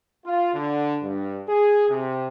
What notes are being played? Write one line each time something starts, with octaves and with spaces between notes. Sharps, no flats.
F4
D3
G2
G#4
C3